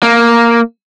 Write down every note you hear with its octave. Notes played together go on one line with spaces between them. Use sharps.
A#3